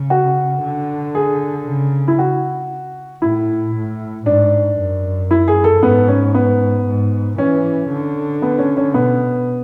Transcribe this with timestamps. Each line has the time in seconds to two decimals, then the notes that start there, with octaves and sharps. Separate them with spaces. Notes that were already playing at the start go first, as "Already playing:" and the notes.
Already playing: C#3
0.10 F#4
0.63 D3
1.15 G#4
1.66 C#3
2.08 E4
2.19 F#4
3.22 A2 E4
3.75 A2
4.26 G#2 D4
4.78 F#2
5.31 E4
5.48 G#4
5.64 A4
5.82 G#2 B3
6.08 C#4
6.34 B3
6.86 G#2
7.38 E3 C#4
7.90 D3
8.42 B3
8.58 C#4
8.77 C#4
8.93 B2 B3